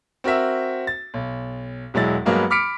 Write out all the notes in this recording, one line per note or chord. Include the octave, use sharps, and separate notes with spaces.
C4 F#4 A#4 E5
A6
B1
E1 F#3 G#3 E4 A6
G2 F#3 G#3 A#3 B3 F#4
B5 D6 F6 B6 C#7 D7